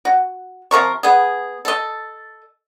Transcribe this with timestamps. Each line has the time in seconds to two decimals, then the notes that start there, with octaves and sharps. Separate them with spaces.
0.05 F#4
0.71 C3 F3 A#4 C#6
1.03 B3 G#4
1.65 A4 D#5